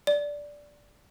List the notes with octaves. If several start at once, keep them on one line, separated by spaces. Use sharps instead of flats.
D5